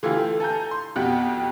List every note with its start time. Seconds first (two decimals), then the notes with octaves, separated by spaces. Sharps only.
0.03 D3 E3 A3 F4 G4
0.40 A4 G#5 A#5 G6
0.71 C6
0.96 F2 B2 G4 F#5 F#6